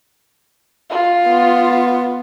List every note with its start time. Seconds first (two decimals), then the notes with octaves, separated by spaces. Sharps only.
0.90 F4
1.28 B3